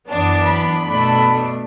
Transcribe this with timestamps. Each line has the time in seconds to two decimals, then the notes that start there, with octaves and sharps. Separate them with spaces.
0.10 F#2 E3 B3 D4 A5
0.48 B5
0.84 B2 A3 D4 B5